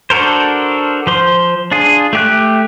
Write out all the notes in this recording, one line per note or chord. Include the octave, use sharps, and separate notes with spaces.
D4 F#4 A4 A#4 C5
F3 C5 C6
D4 F4 G#4
A3 G4 F#6